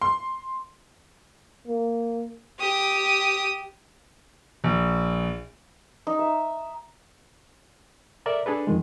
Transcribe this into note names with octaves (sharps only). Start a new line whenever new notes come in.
C6
A#3
G4 D#6
A#1
D#4
E5
A4 A#4 D5 E5
D4 G#4 A4 B4
F2 D#3 G#3